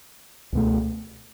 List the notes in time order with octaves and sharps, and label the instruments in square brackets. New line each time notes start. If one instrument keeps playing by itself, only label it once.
[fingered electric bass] C#2 B2 A3